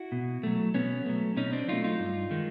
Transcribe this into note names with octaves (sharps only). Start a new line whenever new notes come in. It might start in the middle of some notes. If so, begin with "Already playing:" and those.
Already playing: E4 F#4
B2
F#3 A3
B2 B3 C#4
F#3 A3
B2 C#4 D#4
C4 D4
F#3 A3 D#4 F4
D#4 F4
G2
D#3 G#3